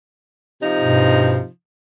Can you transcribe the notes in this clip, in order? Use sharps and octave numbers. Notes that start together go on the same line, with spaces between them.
C3 F3 D#4
G2 B2